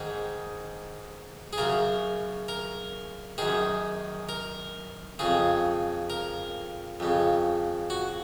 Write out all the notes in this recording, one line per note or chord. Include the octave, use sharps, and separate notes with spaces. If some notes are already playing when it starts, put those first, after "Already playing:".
Already playing: G#2 D#3 G#4
G#4
F#2 C#3 A#4
A#4
F#2 D#3 G#4
A#4
F2 C#3 G#4
A#4
F2 C#3
F#4